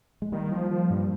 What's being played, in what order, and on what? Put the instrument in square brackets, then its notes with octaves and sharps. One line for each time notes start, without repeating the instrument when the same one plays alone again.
[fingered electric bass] G#3
[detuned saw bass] D#3 [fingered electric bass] G3 A#3
[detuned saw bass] F3
F3
G2